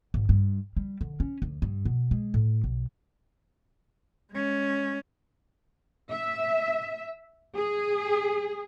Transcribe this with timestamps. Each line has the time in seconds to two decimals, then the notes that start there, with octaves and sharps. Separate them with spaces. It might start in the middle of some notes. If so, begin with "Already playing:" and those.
0.14 G#1
0.29 G2
0.77 G3
1.01 D3
1.20 C#4
1.42 D2
1.62 G2
1.85 B2
2.11 G#3
2.34 A2
2.64 B1
4.32 G#3 C#4
6.10 E5
7.56 G#4